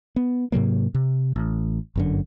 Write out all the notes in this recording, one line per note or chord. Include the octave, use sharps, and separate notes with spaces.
B3
G#2 C3 F#3 A#3
C3
A1
G1 F#2 D3